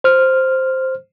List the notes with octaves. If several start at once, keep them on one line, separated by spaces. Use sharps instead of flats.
C5 F6